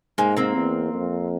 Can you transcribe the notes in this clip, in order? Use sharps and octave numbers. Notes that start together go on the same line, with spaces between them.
G#2 G#3 A#3
A#3 C4
E2
F2